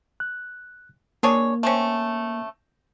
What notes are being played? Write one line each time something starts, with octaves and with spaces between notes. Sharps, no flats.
F#6
A#3 D4 G#4 C#5
A3 C4 C#4